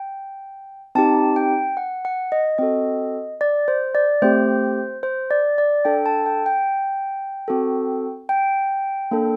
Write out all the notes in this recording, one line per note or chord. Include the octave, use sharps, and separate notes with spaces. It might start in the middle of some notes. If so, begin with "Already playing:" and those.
Already playing: G5
C4 D#4 G4 A5
G5
F#5
F#5
D#5
C4 F#4 A4 D#5
D5
C5
D5
A3 C4 G4 C5
C5
D5
D5
D4 A4 G5
A5
G5
G5
C4 F#4 A4
G5
A#3 D4 A4